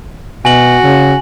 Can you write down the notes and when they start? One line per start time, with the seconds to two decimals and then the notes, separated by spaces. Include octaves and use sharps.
0.45 B2 F#4 G#5 F#7
0.83 C#3